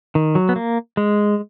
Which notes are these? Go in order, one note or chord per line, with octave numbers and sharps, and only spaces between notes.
D#3
F#3
B3
A#3
G#3